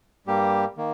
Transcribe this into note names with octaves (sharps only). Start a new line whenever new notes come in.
G2 G3 A#3 G4
D#3 A#3